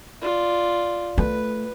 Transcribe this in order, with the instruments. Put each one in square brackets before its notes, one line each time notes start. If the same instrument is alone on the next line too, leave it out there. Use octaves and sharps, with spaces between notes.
[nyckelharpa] F4 D5
[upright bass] A3 [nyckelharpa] B4